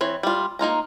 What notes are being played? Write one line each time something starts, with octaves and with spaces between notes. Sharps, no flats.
E3 C4 C#5
G3 F4
A#3 D#4 F4 A#5